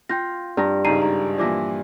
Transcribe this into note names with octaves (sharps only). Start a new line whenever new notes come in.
F4 G5 G6 A#6
G2 A#5 A#6
G#1 G#2 C#3 A#5 C7 D#7
D#4 A#5
A#2 E3 F3 D5 D6 A#6